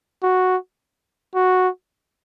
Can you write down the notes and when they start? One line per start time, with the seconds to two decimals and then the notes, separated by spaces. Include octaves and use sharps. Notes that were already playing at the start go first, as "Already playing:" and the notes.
0.23 F#4
1.35 F#4